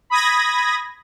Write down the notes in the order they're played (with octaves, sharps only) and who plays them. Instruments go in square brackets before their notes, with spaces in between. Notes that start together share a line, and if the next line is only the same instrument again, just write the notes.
[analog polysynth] B5 D#6 G#6 A#6